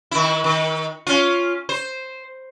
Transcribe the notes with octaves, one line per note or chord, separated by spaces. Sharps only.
D#3 E4
D#3
C#4 F4
C5